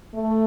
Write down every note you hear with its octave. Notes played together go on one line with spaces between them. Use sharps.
A3